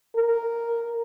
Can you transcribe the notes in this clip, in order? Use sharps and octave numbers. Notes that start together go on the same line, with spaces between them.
A#4